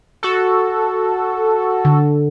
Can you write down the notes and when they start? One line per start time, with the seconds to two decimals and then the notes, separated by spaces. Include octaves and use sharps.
0.23 F#4 A4
1.85 D3